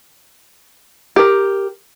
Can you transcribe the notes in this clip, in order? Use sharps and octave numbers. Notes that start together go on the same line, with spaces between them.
G4 A#4